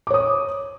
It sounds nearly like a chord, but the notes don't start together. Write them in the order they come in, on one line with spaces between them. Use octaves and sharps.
D6 C#5 D#6